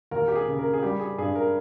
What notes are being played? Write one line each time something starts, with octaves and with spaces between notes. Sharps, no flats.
D#2 A#4
G4
G#4
C#3
A#4
G#4
G3 G4
G#4
G2 G#4
A#4